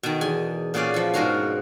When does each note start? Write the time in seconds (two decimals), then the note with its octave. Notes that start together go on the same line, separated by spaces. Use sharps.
0.03 B2 D#3
0.21 E2 G#5
0.74 A#2 B3 C#4 G#4 D5
0.94 F3 E4
1.14 G#2 B2 G#3 F#4 A#4 F5